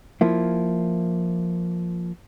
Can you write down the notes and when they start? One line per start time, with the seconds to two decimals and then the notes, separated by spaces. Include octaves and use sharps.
0.21 F3 A#3 E4